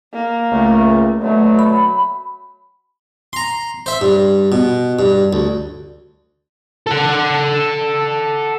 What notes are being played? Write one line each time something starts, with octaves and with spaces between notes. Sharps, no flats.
A#3
C#2 A3
B2 D3 F#3 A3
B5
A#5 C6
C5 E5
G2
B2
G2
D2
A4 F#5